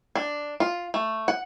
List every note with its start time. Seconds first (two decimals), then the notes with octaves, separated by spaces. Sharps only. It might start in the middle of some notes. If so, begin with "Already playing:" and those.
0.15 D4
0.60 F4
0.94 A3
1.28 F#5